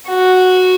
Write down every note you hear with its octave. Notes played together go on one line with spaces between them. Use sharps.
F#4